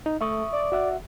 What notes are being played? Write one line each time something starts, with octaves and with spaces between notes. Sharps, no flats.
D#4
A3 E5 C#6 D#6
D5
F#4 E5 F#5